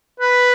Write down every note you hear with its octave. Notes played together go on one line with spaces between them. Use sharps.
B4